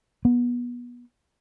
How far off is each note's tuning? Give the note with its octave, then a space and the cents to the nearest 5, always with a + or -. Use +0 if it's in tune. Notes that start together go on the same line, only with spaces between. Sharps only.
B3 -25